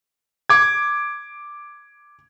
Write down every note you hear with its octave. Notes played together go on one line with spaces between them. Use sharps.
D6 G#6